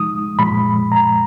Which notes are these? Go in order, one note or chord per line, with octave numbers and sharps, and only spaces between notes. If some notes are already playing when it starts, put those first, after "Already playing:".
Already playing: F3 G#3 D#4 D#6
A#2 F3 G#3 B5
A#5